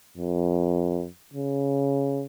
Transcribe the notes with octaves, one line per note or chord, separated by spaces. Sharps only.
F2
C#3